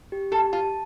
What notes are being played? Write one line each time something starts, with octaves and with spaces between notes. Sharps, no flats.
G4
G4 A4
F4 A5